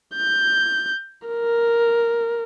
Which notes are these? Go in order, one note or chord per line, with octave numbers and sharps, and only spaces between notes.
G6
A#4